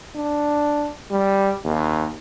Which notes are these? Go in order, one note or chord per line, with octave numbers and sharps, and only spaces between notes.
D4
G3
D#2